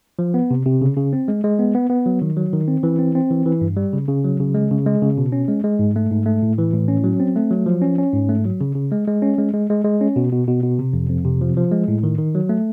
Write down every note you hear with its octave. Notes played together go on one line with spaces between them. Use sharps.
F3
B3
C3
C3
C#3
C#3
C4
G#3
G#3
B3
B3
B3
F#3
D#3
F#3
D#3
C4
E3
C4
C4
E3
E3
G2
G3
C#3
C#3
F#3
C#3
G#3
C#3
G#3
C#3
B2
C#4
G#3
G#3
G#2
A3
G#2
A3
A2
E3
A2
C#4
F#3
C4
A3
F#3
F3
C#4
C#4
G#2
A3
F#3
C#3
C#3
G#3
G#3
C#4
G#3
G#3
G#3
G#3
C#4
B2
B2
B2
B2
C3
F2
F2
C3
F3
F3
G#3
A2
D#3
D#3
F#3
A3